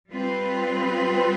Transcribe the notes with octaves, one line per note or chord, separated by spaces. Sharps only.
G3 C4 F4 B4